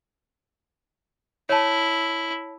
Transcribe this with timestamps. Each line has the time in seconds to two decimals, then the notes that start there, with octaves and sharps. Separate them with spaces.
1.49 E4 C#5 A5